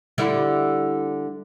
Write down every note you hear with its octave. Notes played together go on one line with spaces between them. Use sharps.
D3 G3 E4